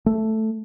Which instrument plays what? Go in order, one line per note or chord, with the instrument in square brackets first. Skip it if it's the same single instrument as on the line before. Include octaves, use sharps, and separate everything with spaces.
[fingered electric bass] A3